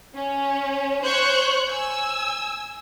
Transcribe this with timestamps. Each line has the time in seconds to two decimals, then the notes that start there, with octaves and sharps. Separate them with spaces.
0.14 C#4
1.04 C5 C#5 C#6 F#6 G6
1.70 G#5 E6